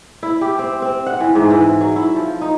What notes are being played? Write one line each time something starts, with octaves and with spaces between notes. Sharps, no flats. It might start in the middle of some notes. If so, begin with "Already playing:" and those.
E4
G4
C4
C4
F#5
E3
G#2
E3
F#3
E4
F3
D#4